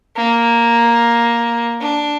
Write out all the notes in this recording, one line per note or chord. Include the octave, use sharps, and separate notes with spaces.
A#3
D4